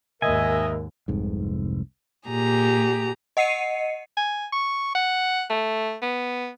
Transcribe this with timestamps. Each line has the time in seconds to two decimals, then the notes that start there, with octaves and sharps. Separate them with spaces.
0.22 D#2 G#2 A#4 D#5 E5 G#5
1.08 F1 C2 G#2
2.28 A#2 G4 G#4 A#5
3.37 D#5 F#5 C7 C#7 D#7
4.17 G#5
4.52 C#6
4.95 F#5
5.50 A3
6.02 B3